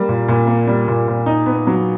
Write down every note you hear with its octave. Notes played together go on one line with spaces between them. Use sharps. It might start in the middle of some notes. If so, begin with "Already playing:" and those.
Already playing: G3 A#3
A#2
A#2
A#3
G3
A#2
A#2
D#4
B3
F#3